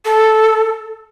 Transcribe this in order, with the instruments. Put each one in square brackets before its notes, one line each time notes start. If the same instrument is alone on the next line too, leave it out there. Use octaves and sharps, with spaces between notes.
[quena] A4